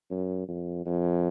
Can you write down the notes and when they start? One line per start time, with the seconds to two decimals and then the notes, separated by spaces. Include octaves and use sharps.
0.11 F#2
0.48 F2
0.86 F2